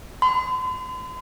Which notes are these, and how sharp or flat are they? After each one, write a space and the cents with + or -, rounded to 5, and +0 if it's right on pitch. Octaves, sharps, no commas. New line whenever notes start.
C6 -45